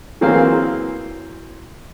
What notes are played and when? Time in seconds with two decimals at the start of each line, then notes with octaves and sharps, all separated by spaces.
0.21 E3 F#3 A#3 C4 G#4 F5